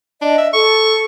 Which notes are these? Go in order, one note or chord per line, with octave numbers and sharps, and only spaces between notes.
D4 D#5
E5
A4 C#6